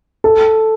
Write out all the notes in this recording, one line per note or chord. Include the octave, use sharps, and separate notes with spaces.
A4